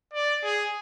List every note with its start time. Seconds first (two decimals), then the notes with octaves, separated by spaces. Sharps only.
0.14 D5
0.43 G#4